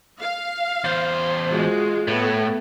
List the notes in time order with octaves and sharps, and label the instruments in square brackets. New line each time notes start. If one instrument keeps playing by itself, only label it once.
[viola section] F5
[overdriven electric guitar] E2 C5
[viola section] G#3 F4 F#4
[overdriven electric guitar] A2 [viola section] A3 B3